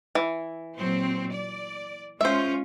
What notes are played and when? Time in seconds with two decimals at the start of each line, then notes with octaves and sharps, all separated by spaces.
0.15 E3
0.77 A#2 F#3 C4
1.34 D5
2.21 G#3 C#4 F4 C5 E5